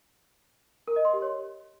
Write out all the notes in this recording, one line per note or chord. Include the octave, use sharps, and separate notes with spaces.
A#4
D#5
C6
G4
C#5